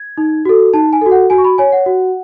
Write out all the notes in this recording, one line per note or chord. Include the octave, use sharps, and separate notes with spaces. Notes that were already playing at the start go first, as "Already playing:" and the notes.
Already playing: G#6
D#4
F#4 A4
D#4 A5
G#5
F#4 A4
F#5
F#4 G#5
C#6
B5
C#5 G#5
F#5
F#4